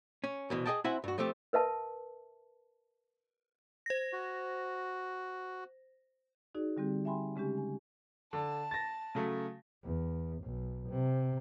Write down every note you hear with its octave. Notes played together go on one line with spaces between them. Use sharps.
C#4
C2 B2 E3
G#4 A4 D#5 G5 A5
C4 E4 F#4 E5 F#5 G#5
G2 F#4
F3 A3 C4 G4
A#4 B4 E5 A5
C5 A#6
F#4
D#4 F#4 G#4 D5
D3 G3 C4 G4
E5 G5 G#5 B5 C6
C#3 G#3 C#4 G4
G#5
D3 A5
A6 A#6
C#3 F#3 A3
E2
B1
C3